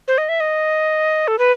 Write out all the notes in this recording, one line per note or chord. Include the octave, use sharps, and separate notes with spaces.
C5
D#5
E5
D#5
A4
B4